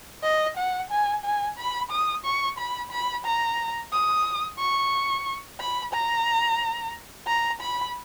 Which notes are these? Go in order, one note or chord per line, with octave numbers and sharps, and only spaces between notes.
D#5
F#5
G#5
G#5
B5
D#6
C#6
B5
B5
A#5
D#6
C#6
B5
A#5
A#5
B5